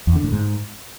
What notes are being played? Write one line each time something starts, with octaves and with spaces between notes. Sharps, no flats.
E2
D3
A2
G#2